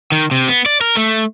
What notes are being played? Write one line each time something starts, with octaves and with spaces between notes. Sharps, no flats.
D#3
C3
B3
D5
A#4
A3